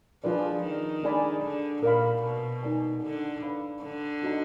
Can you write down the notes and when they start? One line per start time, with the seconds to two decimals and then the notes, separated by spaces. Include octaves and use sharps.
0.24 F3 D4 F4 G#4 B4 D5
0.64 D#3
1.03 D4 G#4 D5 G#5 B5
1.43 D3
1.83 A#2 A#4 D5 F5 B5
2.23 B2
2.63 D#4 A#4 D5 G#5
3.03 D3
3.43 B4 D5 F5 B5
3.83 D3
4.22 D#4 F#4 B4 D#5 A#5